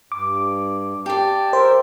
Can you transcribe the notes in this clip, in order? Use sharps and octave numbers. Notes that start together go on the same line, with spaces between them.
G2 D6
G4 D5 A5
A#4 C5 E5 G5